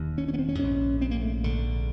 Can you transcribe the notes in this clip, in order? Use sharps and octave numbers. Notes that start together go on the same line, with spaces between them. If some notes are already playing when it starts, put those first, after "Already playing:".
Already playing: E1 D#2
C#4
C#4
B3
C4
C#4
A#1 G#2 C#4
C4
A#3
A3
A#1 G#2 D3